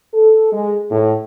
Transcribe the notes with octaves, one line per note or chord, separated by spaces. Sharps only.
A4
G#3
A2